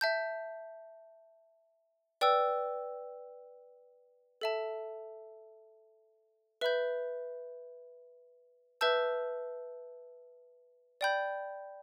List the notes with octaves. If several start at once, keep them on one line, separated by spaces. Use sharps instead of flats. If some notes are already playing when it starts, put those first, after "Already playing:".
E5 A5 G6
B4 D5 G5 E6
A4 E5 A5
B4 E5 B5 G6
B4 E5 A5 E6 G6
D5 G5 B5 G6